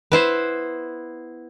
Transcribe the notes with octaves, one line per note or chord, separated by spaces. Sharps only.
B3 E4 C5